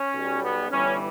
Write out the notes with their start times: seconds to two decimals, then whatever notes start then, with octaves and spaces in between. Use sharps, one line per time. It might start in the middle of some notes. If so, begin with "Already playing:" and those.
Already playing: C#4
0.14 B1 B2 G3
0.42 B3
0.70 G1 G2 E3 G3 C#4